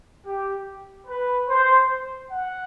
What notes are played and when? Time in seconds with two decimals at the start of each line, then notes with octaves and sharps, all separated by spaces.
0.25 G4
1.06 B4
1.47 C5
2.30 F#5